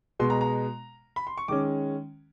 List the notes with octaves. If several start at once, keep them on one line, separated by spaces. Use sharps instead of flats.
B2 G#3 B3 C6
A#5
A#5
B5
C6
C#6
D#3 G#3 C#4 D6